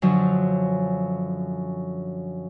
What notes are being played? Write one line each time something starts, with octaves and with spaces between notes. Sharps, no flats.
F#2 D3 F3 F#3